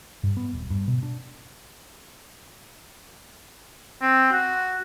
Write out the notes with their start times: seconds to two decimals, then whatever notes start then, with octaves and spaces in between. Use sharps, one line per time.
0.24 G2
0.37 B3
0.53 D#1
0.70 G2
0.88 B2
1.03 D4
4.01 C4
4.32 F#4